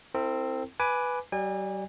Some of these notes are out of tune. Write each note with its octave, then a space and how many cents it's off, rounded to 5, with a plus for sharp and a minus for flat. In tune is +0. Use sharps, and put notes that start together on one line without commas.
C4 +0 E4 +0 A4 +45
B4 +0 G#5 +10 D6 +0
G3 -40 D5 +35 G#5 -35